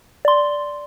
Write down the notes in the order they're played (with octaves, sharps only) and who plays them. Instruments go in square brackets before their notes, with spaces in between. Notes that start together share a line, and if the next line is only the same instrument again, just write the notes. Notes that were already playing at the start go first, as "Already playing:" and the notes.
[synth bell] D5 C6